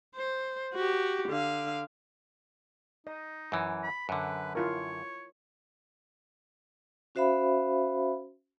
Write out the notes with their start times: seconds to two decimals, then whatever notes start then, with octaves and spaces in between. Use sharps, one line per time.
0.16 C5
0.74 F#4 G4
1.29 D3 F5
3.07 D#4 D#5
3.52 F#2 E3
3.83 B5
4.09 F#2 D3 B4
4.55 E4 F4 A#4 C#5
7.15 C#4 F#4 C5 E5 F5 B5